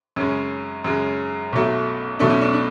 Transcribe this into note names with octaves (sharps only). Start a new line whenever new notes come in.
F#2 C#3 G#3 C#4
F#2 C#3 G#3
B1 B2 F#3 A3
B1 B2 F#3 A3 D4
C#4
D4
D4